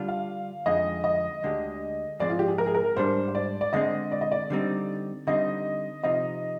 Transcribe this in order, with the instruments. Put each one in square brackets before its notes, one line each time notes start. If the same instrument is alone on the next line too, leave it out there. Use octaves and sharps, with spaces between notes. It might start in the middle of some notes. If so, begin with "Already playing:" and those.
Already playing: [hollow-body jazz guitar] D3 G3 D4 F4
[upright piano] F5
[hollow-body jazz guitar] F2 D3 G#3 D#4 [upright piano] D#5
[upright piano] D#5
[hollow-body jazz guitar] D2 D3 G#3 D4 G4
[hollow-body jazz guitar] G#2 F3 G#3 C4 [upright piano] D5
[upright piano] F4
G4
G#4
A#4
G#4
A#4
[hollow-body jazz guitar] G#2 G3 D4 [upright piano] C5
[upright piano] C5
D5
D5
[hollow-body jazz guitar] D3 G#3 C4 [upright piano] D#5
[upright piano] D5
D#5
D5
[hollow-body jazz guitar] D3 G3 C4 D#4
[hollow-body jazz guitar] D3 G3 C4 D#4 [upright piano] D#5
[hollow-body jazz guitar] C3 F3 C4 D#4 [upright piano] D#5